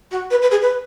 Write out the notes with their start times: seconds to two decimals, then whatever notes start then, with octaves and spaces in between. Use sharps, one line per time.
0.11 F#4
0.31 B4
0.42 B4
0.51 G#4
0.62 B4